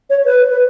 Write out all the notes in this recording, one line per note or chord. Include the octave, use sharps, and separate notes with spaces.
C#5
B4
B4